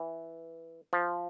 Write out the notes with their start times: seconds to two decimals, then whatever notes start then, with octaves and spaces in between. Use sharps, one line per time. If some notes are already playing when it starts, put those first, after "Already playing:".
Already playing: E3
0.93 F3